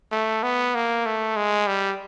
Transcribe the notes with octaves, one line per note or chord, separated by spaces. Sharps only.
A3
B3
A#3
A3
G#3
G3